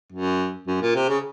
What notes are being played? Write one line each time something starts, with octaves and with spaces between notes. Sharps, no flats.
F#2
F#2
A#2
C3
C#3